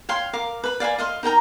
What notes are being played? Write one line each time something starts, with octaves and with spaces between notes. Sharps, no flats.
C#5 F5 G5 C6
A#4 F5 D6
B4 B5
D5 F5 G#5 B5
D#5 F5 C6
D#4 A#4 G5 A#5